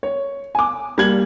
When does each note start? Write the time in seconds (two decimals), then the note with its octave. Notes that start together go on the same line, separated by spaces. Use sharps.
0.03 C#5
0.55 G#5 D6
0.98 G3 A#3 G#6 F#7